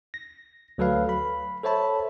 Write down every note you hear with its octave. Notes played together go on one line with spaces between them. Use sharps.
A#6
D2 F#3 A4 B4 F5
B5
A4 C5 C#5 E5 A5 B5